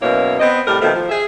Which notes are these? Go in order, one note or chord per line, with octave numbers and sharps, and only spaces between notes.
F#2 B2 A#3 E4 C#5
B3 C4 D#5
A2 C3 G3 A3 A#4
B2 D#3 F3 A3
F3
G#4 E5